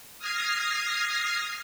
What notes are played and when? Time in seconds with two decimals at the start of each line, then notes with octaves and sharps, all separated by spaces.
0.19 D#6 F6 G#6 A#6 C7